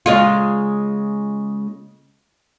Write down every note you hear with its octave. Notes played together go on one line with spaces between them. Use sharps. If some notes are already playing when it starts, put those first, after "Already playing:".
C#3 G#3 F4